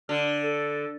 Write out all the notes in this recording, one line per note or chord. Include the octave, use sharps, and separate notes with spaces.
D3 F6
A4